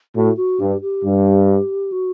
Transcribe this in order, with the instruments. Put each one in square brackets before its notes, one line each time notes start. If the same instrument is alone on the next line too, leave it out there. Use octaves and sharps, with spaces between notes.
[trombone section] A2 [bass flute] F#4
[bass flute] F#4
[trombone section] G2 [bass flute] G4
[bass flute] G4
[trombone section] G2
[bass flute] F#4